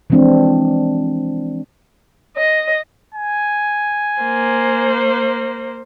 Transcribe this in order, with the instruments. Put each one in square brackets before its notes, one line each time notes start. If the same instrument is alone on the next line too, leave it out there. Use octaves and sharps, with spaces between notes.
[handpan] E3 F3 G#3 C4 D4
[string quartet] D#5
[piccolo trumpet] G#5
[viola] A#3 C5